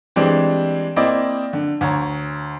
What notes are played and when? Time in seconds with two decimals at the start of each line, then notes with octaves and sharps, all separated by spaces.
0.16 E3 G3 G#3 C4 D4
0.96 A#3 C4 E4 D5 D#5
1.53 D3
1.81 D2 C#5 A#5